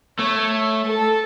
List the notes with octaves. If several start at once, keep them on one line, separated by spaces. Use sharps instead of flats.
A3 C#5
A4